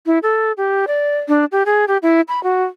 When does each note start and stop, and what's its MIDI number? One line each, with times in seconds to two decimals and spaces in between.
0.06 0.19 64
0.23 0.52 69
0.57 0.85 67
0.87 1.17 74
1.28 1.45 62
1.52 1.63 67
1.66 1.85 68
1.88 1.98 67
2.03 2.21 64
2.28 2.42 83
2.43 2.64 66